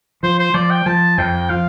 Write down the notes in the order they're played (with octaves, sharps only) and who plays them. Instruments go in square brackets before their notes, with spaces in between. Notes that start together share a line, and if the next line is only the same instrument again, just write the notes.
[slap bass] F3 [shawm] C5
[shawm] C5
[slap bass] F3 [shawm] D5
[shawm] G5
[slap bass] F3 [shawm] A5
[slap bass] F2 [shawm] G5
[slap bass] F3 [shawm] F5